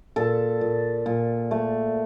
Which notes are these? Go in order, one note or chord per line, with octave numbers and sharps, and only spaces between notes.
A#2 A4
A#2
A#2
A3